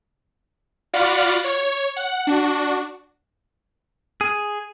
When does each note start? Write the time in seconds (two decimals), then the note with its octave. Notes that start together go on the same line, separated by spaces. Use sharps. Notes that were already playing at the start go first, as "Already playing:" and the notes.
0.93 F4 F#4 D5 F5 F#5 B5
1.44 C#5
1.96 F#5
2.27 D4 F#4
4.21 G#4